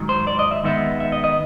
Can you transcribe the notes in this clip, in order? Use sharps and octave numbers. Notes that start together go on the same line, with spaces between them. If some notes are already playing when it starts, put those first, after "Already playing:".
Already playing: G#2 D#3 F#3
C5
D5
D#5
E5
D#3 G#3 B3 D#4 E5
E5
D#5
D#5